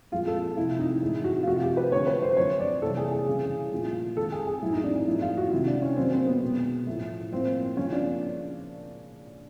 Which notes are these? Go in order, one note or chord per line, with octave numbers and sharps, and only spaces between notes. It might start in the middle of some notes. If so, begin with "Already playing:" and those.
A#2 F3 G#3 F4
A4
C3 F3 A3 E4
D#4
A2 E3 G#3 E4
F#4
F4
C3 F3 A3 F#4
G4
B4
D3 F3 A3 C#5
B4
C5
D3 F#3 A3 C#5
D5
C3 E3 G3 A#3 A4
G#4
G#4
C#3 E3 G3
A#2 F3 A3
D#3 G#3 A4
G#4
G#4
A2 F#3 A3 E4
D#4
D4
A2 F3 A#3 E4
F4
F#4
C3 D#3 G#3 E4
D4
C#4
D#3 F#3 A#3 C4
C4
B3
B2 G#3
A2 F3 A3
A2 F3 A#3 C4
C#3 F3 A#3 C#4
D4